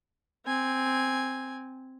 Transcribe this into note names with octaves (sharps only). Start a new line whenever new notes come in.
C4 G#5